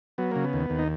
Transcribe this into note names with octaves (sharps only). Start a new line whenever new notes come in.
F#3 B3
C#3 A#3
B3
D#2
D#2
D#4